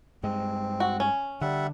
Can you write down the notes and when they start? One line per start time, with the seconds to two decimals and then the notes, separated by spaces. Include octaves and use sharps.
0.23 G2 G#3 C4
0.80 F#4
1.00 C#4
1.41 D3 G3 E5 F#5